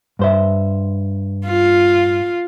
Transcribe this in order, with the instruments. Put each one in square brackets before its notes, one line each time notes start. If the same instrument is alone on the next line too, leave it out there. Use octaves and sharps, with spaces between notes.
[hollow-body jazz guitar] G2 C5 E5
[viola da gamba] F4